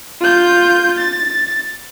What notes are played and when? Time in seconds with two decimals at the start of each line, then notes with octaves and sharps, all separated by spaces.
0.21 F4 G6
0.99 A6